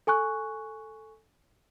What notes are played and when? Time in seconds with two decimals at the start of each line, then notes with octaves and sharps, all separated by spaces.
0.07 A4 G#5 C#6 F#6